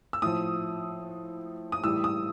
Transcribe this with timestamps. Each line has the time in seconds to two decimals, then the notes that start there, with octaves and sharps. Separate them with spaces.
0.13 E6
0.22 A2 F3 D#6
1.72 D#6
1.84 A2 E3 G3 E6
2.04 D#6